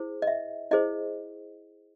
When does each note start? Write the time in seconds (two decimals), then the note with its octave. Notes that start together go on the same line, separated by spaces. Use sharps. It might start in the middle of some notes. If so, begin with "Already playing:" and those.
Already playing: E4 G#4 C5
0.22 D#5
0.27 E5
0.71 E4 G#4 C5 D#5